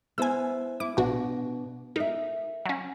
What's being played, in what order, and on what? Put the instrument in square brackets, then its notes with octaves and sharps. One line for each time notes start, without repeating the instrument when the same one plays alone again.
[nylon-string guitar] B3 E4 C5 [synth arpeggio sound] G#5 E6
[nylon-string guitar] E4 [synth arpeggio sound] D6
[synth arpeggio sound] A#1 F#4 [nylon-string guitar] B2 D4
[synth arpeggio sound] D#4 [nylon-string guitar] A#4 E5
[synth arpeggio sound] F#3 C#4